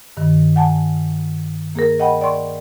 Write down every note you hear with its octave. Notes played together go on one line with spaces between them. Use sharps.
G2 D#3
F#5 G#5 A5
A#3 G#4 A#4
D#5 F#5 G5 B5
D5 G5 C6 C#6